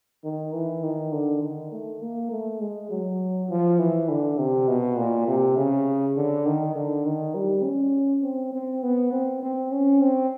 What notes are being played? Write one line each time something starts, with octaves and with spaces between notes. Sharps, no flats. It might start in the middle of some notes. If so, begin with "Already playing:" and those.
D#3
E3
D#3
D3
D#3
A3
A#3
A3
G#3
F#3
F3
E3
D3
C3
B2
A#2
C3
C#3
D3
D#3
D3
D#3
G3
C#4
C4
C4
B3
C4
C4
C#4
C4